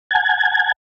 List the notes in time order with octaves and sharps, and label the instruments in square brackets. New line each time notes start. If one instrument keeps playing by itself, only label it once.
[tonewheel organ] F#5 G#5 A5 G#6